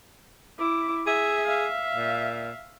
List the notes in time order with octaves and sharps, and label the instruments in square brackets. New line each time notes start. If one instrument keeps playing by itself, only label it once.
[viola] E4 D6
[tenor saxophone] G#4 [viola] E5
[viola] E5 F5
[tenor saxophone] A#2